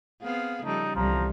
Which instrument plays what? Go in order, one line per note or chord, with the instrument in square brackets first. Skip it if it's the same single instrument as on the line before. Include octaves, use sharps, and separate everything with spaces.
[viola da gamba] B3 C4 G#4 [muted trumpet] F5
[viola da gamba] C#3 F3 G3 [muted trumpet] A3 [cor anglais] D#4
[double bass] C2 G3 [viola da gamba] D3 E3 [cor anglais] F3 [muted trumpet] A#5